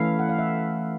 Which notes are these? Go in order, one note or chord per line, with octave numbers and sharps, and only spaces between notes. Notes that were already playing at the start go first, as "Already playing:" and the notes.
Already playing: E3 A3 C#4 E4 F5
F#5
F5
E5